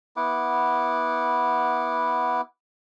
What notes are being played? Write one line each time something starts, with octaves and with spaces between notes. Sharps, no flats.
B3 E4 F#5 D6